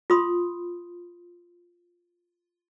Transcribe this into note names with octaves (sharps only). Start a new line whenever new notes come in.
F4 B5 C6 D#6